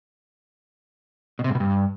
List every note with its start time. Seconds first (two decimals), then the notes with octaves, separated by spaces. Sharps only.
1.39 B2
1.44 C3
1.50 G#2
1.55 B2
1.60 G2